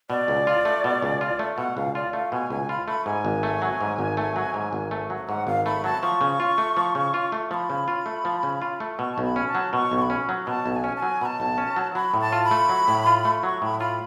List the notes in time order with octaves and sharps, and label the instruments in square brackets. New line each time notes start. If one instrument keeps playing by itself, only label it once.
[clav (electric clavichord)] B2 [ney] D5
[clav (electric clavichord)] C#2
F4
A3
B2
C#2
F4
A3
[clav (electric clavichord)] B2 [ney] F#5
[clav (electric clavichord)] C#2 [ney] F5
[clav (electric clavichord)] F4 [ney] D5
[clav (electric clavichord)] A3 [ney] F5
[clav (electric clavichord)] B2 [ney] G#5
[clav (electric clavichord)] C#2 [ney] G#5
[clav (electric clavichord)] F4 [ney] B5
[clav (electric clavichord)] A3 [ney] B5
[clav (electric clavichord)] G#2 [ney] G#5
[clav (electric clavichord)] G#1
A3
F#3
G#2
G#1
A3
F#3
G#2
G#1
A3
F#3
[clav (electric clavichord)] G#2 [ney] F#5
[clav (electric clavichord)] G#1 [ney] F5
[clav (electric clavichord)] A3 [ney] B5
[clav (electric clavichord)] F#3 [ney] A5
[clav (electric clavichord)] F3 [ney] C#6
[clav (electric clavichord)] C#3
F4
A3
F3
C#3
F4
A3
[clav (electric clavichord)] F3 [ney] B5 C#6
[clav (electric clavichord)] C#3
F4
A3
F3
C#3
F4
A3
[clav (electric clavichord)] B2 [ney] C#6
[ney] A5
[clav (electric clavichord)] B1
[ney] B5
[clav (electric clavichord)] C#4
[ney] A5
[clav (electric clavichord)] F#3
[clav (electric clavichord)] B2 [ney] C#6
[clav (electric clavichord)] B1
[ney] C#6
B5
[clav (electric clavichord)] C#4
F#3
[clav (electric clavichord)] B2 [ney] A5
[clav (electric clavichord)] B1
[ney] A5
G#5
[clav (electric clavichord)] C#4
[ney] A5
[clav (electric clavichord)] F#3 [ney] G#5
[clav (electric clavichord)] B2 [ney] A5 B5
[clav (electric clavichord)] B1
C#4
F#3
[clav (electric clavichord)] F#3 [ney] B5
[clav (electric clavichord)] A2
[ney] A5
[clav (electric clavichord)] F4
[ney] B5
[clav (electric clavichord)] A3
F#3
A2
F4
A3
[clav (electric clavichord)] F#3 [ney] C#6
[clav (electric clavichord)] A2 [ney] B5
[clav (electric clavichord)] F4 [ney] B5